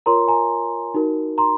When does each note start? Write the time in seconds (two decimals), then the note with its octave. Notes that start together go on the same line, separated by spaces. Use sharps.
0.06 F4 A#4 C#5 A#5 C6
0.28 G#5 A#5
0.94 D#4 F#4 A#4
1.38 A#5 C6